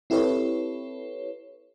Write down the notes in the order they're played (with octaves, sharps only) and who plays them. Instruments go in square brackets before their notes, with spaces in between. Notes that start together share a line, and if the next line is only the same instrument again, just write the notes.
[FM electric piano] C4 E4 G4 A4 B4 C#5